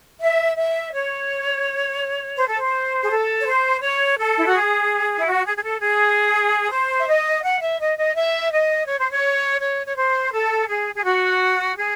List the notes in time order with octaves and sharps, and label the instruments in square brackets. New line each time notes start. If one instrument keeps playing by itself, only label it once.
[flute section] E5
E5
C#5
C5
A4
C5
G#4
A4
C#5
C5
C#5
A4
E4
F#4
G#4
E4
F#4
G#4
G#4
A4
G#4
C5
E5
D#5
F#5
E5
D#5
D#5
E5
D#5
C#5
C5
C#5
C#5
C#5
C5
A4
G#4
G#4
F#4
G#4